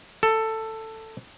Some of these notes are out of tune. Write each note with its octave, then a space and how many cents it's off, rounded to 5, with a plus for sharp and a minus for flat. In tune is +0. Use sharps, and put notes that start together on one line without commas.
A4 +10